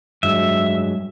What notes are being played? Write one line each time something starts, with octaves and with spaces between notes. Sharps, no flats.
G2 F#3 G#3 E5